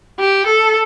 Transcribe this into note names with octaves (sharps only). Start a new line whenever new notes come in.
G4
A4